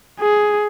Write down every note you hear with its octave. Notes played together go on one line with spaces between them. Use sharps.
G#4